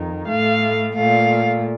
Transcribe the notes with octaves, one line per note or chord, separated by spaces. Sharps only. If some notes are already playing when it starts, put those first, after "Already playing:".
Already playing: F2 D#3
A2 A3 F5
A#2 A3 F5